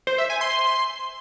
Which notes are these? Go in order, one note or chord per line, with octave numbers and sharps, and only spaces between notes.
C5
E5
G#5
C6